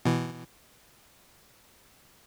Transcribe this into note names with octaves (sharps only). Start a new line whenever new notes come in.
B2 E3